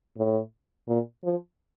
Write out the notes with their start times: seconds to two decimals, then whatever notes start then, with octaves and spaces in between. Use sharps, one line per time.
0.17 A2
0.88 A#2
1.24 F3